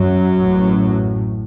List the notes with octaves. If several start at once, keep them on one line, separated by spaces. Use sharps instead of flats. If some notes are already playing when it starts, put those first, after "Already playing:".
Already playing: F#2 F#3
A1 A2